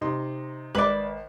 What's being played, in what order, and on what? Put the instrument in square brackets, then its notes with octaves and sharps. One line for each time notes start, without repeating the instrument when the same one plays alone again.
[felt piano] C3 D#4 C6
[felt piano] G#1 [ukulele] B4 D5